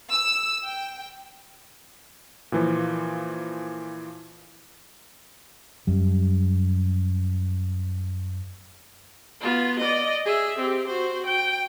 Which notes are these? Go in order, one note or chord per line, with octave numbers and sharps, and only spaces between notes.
E6
G5
A#2 E3 F3
F#2 G3
B3 F4
D5 D#5
G#4 E5
C4 G4
F#4 C5
G5